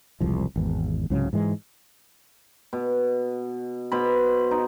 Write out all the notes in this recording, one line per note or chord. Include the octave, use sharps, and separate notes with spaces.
E1 C2 F3
G#1 E2
C2 G#2 C#3 F#3
G#2 E3 G#3
B2
B2 C5 B5
D#4